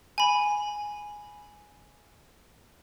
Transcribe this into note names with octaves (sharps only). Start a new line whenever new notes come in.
G#5 B5